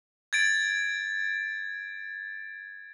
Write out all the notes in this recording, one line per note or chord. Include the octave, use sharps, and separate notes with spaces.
G#6 A6 D7